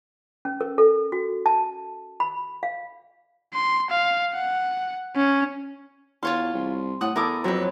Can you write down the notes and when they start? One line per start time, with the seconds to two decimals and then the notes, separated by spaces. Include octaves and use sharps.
0.45 C#4
0.61 A#4
0.78 A4
1.12 F#4
1.46 A5
2.20 B5
2.63 F5
3.54 C6
3.90 F5
4.35 F#5
5.16 C#4
6.23 E2 F4 C#5 F5 C6
6.54 C2
7.01 A2 F#5 D#6
7.16 E2 E4 A4 A#4 D6 D#6
7.44 F2 F#3 C4 A#4 B4